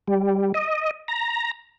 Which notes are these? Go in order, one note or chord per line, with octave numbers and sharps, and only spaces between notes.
G3
D#5
A#5